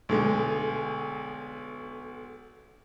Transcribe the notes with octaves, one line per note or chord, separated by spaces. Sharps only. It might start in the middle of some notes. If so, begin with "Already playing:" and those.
B1 D3 G#3